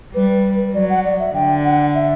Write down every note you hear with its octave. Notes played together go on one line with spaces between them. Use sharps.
G3 B4
F#3 D5
F#5
D5
E5
D3 G5
F#5
E5